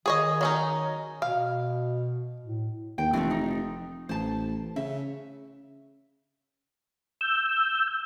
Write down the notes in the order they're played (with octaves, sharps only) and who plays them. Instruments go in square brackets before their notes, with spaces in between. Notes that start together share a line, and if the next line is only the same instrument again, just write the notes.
[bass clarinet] D#3 [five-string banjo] G#4 C#5 D#5
[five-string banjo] F#3 C#4 D#4
[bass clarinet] B2 [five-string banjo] F5
[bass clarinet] A2
[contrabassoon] D#2 [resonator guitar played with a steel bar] G5
[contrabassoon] F1 [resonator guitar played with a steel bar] E3 F3 A3
[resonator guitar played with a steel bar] D#4
[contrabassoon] A1 [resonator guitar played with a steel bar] C5 A5
[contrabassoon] C#3 [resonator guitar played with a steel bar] E5
[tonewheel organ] E6 G6